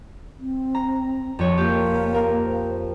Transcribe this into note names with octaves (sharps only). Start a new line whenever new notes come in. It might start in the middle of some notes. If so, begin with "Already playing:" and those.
C4
A#5
F2 C#5
A#3 F4 G4
A#4
C5